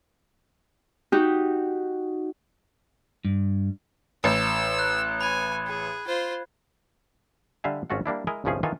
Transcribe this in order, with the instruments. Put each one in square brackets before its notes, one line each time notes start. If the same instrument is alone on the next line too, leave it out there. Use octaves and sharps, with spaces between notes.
[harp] D#4 F#4 G4
[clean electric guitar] G2
[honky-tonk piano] A1 [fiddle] E6
[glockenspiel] F#6
[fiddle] G#5 [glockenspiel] B5 G#6
[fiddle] G#4
F4 C5
[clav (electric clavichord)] D3 G3 E5 F5 G#5
G#1 C#4 F4 F#4 A4 F#5
G3 A#3 D4 E4
G#3 E4 A#4 D#5 G#5
G1 C2 F3 C#4 G#4 F5
D#3 E3 B3 F4 A4 G#5